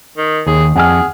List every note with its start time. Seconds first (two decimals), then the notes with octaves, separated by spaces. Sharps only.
0.17 D#3
0.47 D#2 G#4
0.76 F2 G#4 F#5 G#5 F6